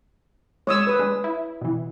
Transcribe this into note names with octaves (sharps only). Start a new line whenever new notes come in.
G#3 C#5 D#6 E6
B4 D#6
G#3 D4
E4
B2 E3